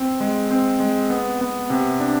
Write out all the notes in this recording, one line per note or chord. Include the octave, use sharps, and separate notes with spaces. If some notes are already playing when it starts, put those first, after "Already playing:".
Already playing: C4
G#3
C4
G#3
B3
B3
C3
D4